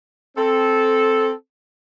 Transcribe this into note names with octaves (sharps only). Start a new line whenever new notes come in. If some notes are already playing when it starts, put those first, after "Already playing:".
C4 A4